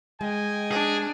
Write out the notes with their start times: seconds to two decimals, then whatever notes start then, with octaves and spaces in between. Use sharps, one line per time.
0.21 G#3 D#5 G5 G#5
0.71 D4 G#4